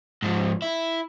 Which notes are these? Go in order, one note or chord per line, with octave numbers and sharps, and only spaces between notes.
G#2 F3
E4